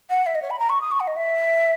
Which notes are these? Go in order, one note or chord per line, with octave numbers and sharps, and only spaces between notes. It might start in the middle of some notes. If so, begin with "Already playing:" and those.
F#5
E5
D#5
C#5
B5
A#5
C#6
D#6
C#6
F#5
D#5
E5